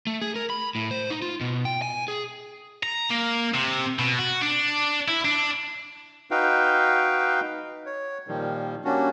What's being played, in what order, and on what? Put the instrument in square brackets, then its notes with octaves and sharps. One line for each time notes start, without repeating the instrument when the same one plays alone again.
[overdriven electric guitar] A3
G#4
A#4
B5
A2
C5
D#4
F4
B2
G5
G#5
G#4
[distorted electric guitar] A#5
A#3
C3
B2
F#4
D4
E4
D4
[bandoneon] D#4 F#4 B4 F5 G5
C#5
A#2 D#3 F3 G3
G3 A#3 C#4 D4 F#4